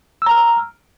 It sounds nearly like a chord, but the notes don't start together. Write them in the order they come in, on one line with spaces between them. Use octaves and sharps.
E6 A#5 F6